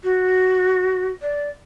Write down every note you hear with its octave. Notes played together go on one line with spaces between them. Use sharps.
F#4
D5